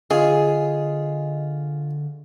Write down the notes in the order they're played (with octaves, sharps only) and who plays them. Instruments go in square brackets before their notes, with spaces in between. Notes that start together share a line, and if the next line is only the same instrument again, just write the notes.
[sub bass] D3 [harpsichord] F4 C#5 [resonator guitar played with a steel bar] G#4 [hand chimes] D#5